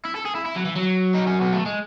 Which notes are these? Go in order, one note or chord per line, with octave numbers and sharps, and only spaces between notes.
E4
A4
G#4
E4
E4
F#3
E3
F#3
D#4
C#4
B3
A3
G#3